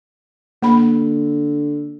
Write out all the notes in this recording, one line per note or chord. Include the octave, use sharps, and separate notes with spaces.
D3 A#3 B5